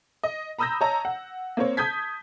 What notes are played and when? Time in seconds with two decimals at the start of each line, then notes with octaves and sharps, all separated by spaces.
0.23 D#5
0.58 A#5 B5 D#6 E6 G6 A#6
0.81 C#5 D#5 A5 A#5
1.05 F#5
1.57 A#3 C4 C#5
1.77 A5 D#6 G6 G#6 B6